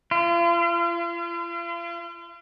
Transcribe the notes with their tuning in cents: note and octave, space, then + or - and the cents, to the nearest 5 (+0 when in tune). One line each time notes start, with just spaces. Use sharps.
F4 -40